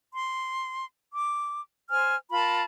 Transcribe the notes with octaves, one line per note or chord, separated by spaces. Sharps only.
C6
D6
C5 G#5 F6
F4 A#4 A5 B5